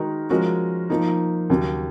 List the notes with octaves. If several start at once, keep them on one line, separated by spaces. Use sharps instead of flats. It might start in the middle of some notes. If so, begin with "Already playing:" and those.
Already playing: D#3 G#3 D#4 F#4 A#4
F3 G#3 C#4 F#4 A#4
F3 A#3 D#4
D#2 C#3 F#3